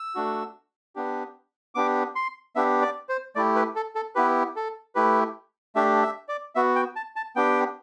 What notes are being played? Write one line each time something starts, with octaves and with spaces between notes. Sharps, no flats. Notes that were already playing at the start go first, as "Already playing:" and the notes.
Already playing: E6
A3 D4 F#4
B3 D4 G4
B3 D4 G4 D6
C6
B3 D4 G4 E5
D5
C5
A3 E4 G4 D5
B4
A4
A4
B3 E4 G4 B4
A4
A3 E4 G4 B4
A3 D4 G4 E5
E5
D5
B3 F#4 E5
G5
A5
A5
B3 D4 G4 G5